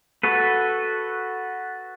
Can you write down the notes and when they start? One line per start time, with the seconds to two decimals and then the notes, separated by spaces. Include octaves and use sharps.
0.23 F#4 A4 B4